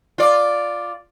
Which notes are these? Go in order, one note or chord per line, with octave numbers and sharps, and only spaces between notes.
F4 D5